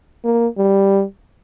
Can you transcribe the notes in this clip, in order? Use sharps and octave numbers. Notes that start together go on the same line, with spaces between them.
A#3
G3